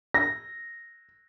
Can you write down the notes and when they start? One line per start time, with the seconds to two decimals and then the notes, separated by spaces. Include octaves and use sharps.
0.14 A#6